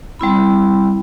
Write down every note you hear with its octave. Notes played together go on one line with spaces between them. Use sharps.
G3 C4 E4 B5